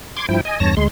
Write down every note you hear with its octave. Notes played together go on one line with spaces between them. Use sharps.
C6 D6 G#6
G2 F3 E4 G5
D#5 G#5
E2 G2 C#5 A5 A#6
D2 G#3 C6